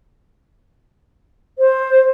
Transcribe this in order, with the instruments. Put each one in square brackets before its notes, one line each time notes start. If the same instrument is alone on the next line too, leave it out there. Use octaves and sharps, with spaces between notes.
[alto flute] C5